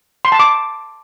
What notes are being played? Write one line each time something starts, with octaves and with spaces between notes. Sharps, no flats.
C6
A5
D6